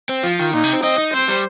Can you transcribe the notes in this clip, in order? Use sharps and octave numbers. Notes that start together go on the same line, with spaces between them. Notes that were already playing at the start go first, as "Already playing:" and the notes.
C4
F3 F4
D#3
A#2 D#4
C3
C4
C4 D#5
D#4
C4 C5
G3